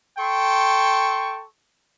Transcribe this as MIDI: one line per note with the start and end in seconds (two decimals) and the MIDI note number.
0.18 1.44 69
0.18 1.44 79
0.18 1.44 84
0.18 1.44 85